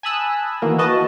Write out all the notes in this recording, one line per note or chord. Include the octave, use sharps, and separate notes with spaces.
G#5 A5 B5 D#6 E6 F#6
D#3 E3 A#3 E4 F#4 A#4
F#4 B4 D#5 A5